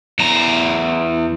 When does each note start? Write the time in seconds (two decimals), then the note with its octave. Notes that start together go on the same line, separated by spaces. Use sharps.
0.19 E2 A#5